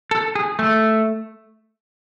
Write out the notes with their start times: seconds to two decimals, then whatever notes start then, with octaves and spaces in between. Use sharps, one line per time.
0.11 A4
0.35 G#4
0.59 A3